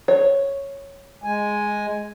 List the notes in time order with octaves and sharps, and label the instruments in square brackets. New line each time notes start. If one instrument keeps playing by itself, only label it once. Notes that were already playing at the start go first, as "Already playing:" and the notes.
[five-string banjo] C#5
[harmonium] G#3 G#5